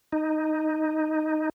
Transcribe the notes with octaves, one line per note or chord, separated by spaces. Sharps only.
D#4